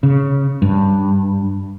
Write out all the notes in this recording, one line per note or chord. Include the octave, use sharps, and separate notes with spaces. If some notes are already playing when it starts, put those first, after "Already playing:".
C#3
G2